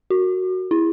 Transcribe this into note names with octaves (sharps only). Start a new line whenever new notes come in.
F#4
E4